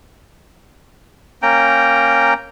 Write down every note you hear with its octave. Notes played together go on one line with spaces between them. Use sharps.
A#3 C#4 G5 A#5